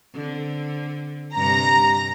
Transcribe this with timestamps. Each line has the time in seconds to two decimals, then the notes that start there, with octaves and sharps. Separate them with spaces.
0.14 D3 C4
1.36 G2 C3 G3 A#5